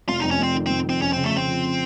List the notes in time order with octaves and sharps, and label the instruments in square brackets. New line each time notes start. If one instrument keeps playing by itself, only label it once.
[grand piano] F1 [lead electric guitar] F4
[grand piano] F2 [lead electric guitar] D#4
[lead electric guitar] C#4
[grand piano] F1 [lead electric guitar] C4
[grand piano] D#3
[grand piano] F1 [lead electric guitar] C4
[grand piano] F2 [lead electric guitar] C4
[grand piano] F2 [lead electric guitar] C#4
[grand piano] C#3 [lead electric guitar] C4
[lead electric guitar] A3
[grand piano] F2
[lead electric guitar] C4
[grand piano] F3